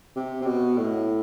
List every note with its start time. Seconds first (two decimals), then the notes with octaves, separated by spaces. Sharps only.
0.16 C3
0.42 C3
0.47 B2
0.78 A2